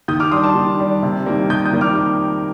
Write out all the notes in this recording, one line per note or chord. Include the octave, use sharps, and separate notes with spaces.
D#3 D#6 G6
D6 F6
G3 D4 C6 D#6
A5 C6
D#3
G3 D4
C3
D#3 G3 A#3
C3 D#6 G6
D#6 G6
D#3 G3 A#3
D6 F6